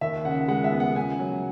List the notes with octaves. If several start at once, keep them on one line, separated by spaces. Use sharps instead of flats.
D#2 E5
C#3 F#5
G#3 F#5
E5
B3
F#5
C#3 G#5
F#3